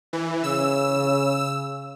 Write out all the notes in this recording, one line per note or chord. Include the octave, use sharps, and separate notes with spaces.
E3
C#3 E6